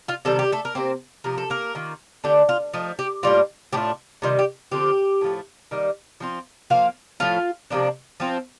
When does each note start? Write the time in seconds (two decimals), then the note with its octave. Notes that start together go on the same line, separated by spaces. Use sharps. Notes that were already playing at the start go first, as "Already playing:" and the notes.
0.08 F4 F5
0.25 C3 D#3 G3 A4
0.39 G4
0.52 A3 A4
0.65 A#4
0.75 C3 D#3 A#3 C4 C5
1.24 C3 F3 A#3 A#4
1.38 A4
1.50 A#3 A#4
1.75 D#3 A#3 F4
2.24 D3 A3 D4 G4
2.49 F4
2.74 F3 A3 D#4
2.99 G4
3.23 A2 G3 A#3 F4
3.73 A2 A3 D4 F4 G4
4.22 C3 D#3 G3 F4
4.39 G4
4.71 D3 F3 C4 F4 G4
5.21 A2 F3 A3
5.71 D#3 G3 A#3
6.20 F3 C4 F4
6.70 F3 A#3 F4 F5
7.20 A2 F3 A3 F4 F5
7.70 C3 F3 A#3 D4
8.20 F3 C4 F4